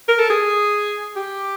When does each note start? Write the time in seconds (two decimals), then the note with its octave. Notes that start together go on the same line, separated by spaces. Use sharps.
0.08 A#4
0.19 A4
0.30 G#4
1.17 G4